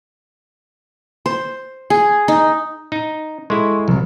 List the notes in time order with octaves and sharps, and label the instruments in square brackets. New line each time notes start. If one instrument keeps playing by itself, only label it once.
[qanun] C5
G#4
D#4
[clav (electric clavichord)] D#4
[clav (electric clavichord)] G#3 E4 [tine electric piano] A4 C6 C#6
[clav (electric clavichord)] C2 [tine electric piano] C3 F3 F#3